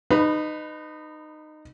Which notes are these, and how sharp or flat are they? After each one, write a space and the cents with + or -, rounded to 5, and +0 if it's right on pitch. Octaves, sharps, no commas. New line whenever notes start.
D#4 -20 B4 +20 B5 +0